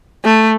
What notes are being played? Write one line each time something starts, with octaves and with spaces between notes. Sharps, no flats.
A3